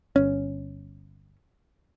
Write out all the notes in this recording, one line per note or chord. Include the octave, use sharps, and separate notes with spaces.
G1 C#4